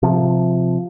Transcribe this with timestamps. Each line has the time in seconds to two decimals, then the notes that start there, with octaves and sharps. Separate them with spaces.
0.03 C3 F3